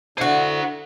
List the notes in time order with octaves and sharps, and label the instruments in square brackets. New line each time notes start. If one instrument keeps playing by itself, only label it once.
[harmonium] D3 [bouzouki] E4 F#4 [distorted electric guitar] C5 F#5